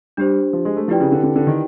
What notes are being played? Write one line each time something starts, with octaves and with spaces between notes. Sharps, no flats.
G3 D4 G4 C5
F3
G#3
A3
F3 E4 G4 B4 D5 G5
C#3
D3
D3
D3
D#3